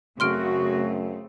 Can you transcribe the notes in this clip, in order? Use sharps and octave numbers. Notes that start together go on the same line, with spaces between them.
F#2 C#3 A3 C4 F#4 C6 F6 D7